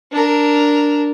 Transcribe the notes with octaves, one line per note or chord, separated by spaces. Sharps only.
D4 A#4